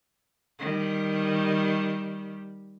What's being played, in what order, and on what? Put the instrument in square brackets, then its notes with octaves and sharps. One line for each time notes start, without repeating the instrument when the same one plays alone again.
[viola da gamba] D#3 G3